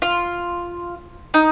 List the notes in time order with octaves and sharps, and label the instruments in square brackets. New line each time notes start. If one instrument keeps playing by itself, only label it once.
[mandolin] F4
D#4